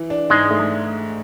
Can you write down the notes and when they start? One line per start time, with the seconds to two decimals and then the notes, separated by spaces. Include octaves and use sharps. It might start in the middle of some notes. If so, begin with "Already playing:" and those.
Already playing: E3
0.10 D4
0.30 G#2 G#3
0.50 A3